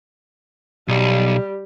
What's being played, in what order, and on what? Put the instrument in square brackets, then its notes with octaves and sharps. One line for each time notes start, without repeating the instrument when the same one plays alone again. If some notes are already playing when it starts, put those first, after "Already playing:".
[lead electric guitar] B1 [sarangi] G3